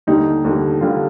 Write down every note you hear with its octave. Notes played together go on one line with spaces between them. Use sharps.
D#2 D3 G3 D#4
D#2 D3 G3
D#2 D3 G3 F4